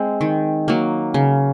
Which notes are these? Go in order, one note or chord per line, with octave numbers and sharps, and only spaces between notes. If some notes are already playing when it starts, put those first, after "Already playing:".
Already playing: G#3 C4
D#3
F#3 A#3
C#3